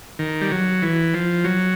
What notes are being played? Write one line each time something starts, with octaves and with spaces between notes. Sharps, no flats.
D#3
G3
F#3
E3
F3
F#3